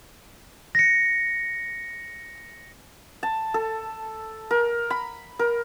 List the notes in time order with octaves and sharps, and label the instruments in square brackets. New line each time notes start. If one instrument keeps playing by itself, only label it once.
[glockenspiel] A#6 C#7
[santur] A5
A4
A#4
B5
A#4